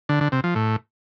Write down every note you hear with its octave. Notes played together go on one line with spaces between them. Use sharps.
D3
D3
C3
F3
A2